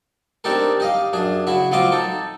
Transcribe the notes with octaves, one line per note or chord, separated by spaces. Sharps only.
C4 D4 D#4 G4 A4 A#4
G4 D#5 F5
F#2 D4 G#4
C#3 E4 F#4 E5
F#3 C4 F4 D#5 C6 D6
D#4 A4